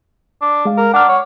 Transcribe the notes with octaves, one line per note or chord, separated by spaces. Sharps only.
D4
G#3 F5
A#4
D4 F#5 F6
C#5